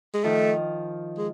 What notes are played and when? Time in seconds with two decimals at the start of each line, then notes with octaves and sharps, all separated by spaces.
0.14 G#3
0.24 D#3 F3 A3
1.18 G#3